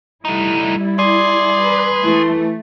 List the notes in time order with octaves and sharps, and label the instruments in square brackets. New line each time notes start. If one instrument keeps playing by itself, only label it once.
[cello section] G3 E4 [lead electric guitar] A3 D#4
[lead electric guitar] G#4 [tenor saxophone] D5 [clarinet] C6
[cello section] B4
[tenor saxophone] E3 [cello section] A3